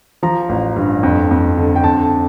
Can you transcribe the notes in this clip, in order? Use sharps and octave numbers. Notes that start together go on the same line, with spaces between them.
F3 A#5
A1
G2
F2
F2
D3
G5
F2 A5